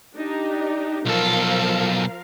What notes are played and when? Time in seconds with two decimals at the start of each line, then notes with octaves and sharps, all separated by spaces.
0.15 D4 D#4 G4
1.06 B1 F3 A4 A#4 F5